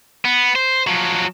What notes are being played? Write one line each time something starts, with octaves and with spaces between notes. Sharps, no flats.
B3
C5
F3 F#3